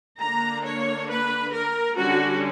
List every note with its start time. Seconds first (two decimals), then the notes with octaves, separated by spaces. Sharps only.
0.20 D3 A#3 D4 A#5
0.65 C#5
1.09 B4
1.52 A#4
1.97 D3 G3 C#4 F#4